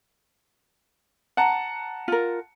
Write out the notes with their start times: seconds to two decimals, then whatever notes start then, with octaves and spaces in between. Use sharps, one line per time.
1.37 F#5 A5 A#5
2.08 F4 A#4